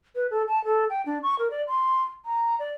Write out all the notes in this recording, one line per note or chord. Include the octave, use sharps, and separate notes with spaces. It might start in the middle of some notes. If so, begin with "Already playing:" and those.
B4
A4
A5
A4
G5
D4
C#6
A#4
D5
C6
A#5
D5